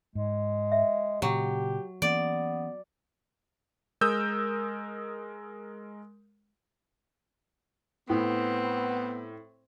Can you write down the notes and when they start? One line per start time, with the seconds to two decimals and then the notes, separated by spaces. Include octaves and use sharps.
0.15 G#2 G#3
0.72 E5
1.22 A#2 C#3 F#3 G4
2.02 E3 A#3 B3 C#4 D5
4.01 G#3 A#4 D#6 E6 G6
8.10 A2 B3 C4